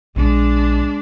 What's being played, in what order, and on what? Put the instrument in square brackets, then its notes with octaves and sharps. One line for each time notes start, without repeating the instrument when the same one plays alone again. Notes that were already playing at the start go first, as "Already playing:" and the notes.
[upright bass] A#1 [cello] G#3 D4